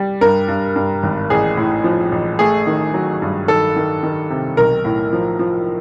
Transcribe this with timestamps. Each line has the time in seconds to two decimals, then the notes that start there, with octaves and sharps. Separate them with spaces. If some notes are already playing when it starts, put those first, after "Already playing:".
Already playing: G3
0.21 G2 A#4
0.48 G2
0.76 G2
1.03 G#1
1.30 A1 G#4
1.57 A2
1.84 F3
2.12 A1
2.39 A3 G#4
2.67 D#3
2.94 F#3
3.22 G2
3.48 D#3 A4
3.76 D#3
4.03 D#3
4.30 C3
4.57 B1 A#4
4.85 A2
5.13 F3
5.39 F3